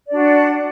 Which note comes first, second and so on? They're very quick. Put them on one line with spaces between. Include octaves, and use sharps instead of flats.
D5 D4 F#4 F#5